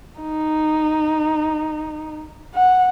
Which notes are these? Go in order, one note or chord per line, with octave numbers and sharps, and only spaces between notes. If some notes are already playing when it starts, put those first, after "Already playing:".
D#4
F#5